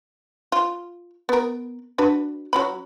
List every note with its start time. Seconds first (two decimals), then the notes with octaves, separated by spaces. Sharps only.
0.52 F4
1.29 B3 A#4
1.98 D4 F#4 B4
2.53 F#3 C#4 B5